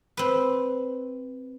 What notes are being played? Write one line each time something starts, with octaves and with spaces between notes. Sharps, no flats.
C4 B4